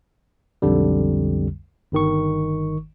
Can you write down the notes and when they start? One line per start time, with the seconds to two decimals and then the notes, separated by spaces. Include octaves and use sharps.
0.62 B1 F2 D3 G3
1.92 G1 D#3 C#6